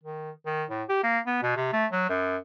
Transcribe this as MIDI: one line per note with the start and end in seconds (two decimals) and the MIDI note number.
0.03 0.31 51
0.46 0.64 51
0.70 0.83 45
0.89 1.02 67
1.04 1.19 58
1.26 1.40 59
1.43 1.53 47
1.57 1.68 48
1.73 1.86 57
1.92 2.05 54
2.09 2.37 42